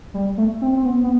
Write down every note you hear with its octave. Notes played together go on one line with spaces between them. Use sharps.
G3
A3
C4
C4
B3
B3